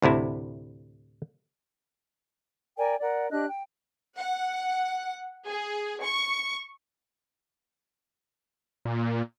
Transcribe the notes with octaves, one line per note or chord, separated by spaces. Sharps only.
D2 A2 C3 E4
A#4 D5 G5 G#5
A#4 D5 F#5
D4 G4 D#5 F#6
G5
F#5
G#4
C#6
A#2